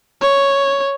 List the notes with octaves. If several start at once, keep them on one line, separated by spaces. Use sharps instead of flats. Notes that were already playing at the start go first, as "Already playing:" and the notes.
C#5